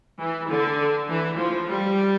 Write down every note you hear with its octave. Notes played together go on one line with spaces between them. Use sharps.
E3
D3
E3
F3
G3